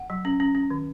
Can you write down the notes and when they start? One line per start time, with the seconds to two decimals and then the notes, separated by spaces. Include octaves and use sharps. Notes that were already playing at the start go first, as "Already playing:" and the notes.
Already playing: F#5
0.10 F#3
0.25 C#4
0.40 C#4
0.55 C#4
0.70 D#3